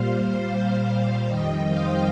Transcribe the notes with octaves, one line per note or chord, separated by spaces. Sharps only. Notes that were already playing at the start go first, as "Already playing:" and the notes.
Already playing: A#2 G3 C5 F5
C5 F5
C5 F5
F2 D#3 G3 D#5 G5
C5 F5